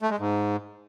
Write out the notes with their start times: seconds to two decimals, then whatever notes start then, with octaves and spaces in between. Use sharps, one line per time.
0.02 A3
0.10 G#3
0.19 G#2